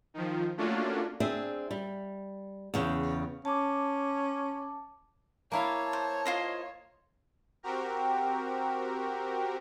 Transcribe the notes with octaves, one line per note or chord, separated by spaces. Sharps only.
D#3 F3
A3 A#3 C#4 D4 F4 F#4
C4 D4 G#4 E5
G3
E2 C#3 G5
C#4 A5 D6
A#3 E4 C#5 F5 A5
C5
F4 C5 D#5
C4 F#4 G4 A#4